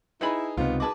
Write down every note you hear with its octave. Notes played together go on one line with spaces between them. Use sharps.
D#4 E4 G#4 B4 A5 B5
C#2 C3 B3 D#4 F4
F#4 G#4 B4 A5 D6